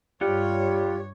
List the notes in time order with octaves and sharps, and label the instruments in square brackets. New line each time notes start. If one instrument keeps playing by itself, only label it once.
[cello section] G2 C#5 [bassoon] G3 [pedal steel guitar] F4 F#5 [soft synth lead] G4